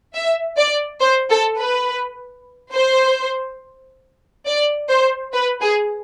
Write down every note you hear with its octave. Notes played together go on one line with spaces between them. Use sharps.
E5
D5
C5
A4
B4
C5
D5
C5
B4
G#4